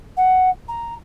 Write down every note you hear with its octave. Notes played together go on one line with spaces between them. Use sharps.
F#5
A#5